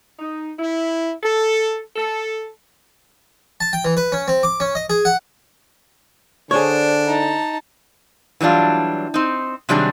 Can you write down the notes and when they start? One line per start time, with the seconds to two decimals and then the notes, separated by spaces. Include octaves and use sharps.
0.19 D#4
0.59 E4
1.23 A4
1.96 A4
3.60 A5
3.73 G5
3.85 E3
3.97 B4
4.12 C#4
4.28 C4
4.43 D6
4.60 C#4
4.75 D#5
4.90 G#4
5.05 F#5
6.51 D3 D4 G#4 C5 C#5
7.07 D#4 A5
8.41 E3 F#3 G3 D4 F4
9.14 C4 D#4
9.69 C3 D#3 F#3 G3 D4 G#4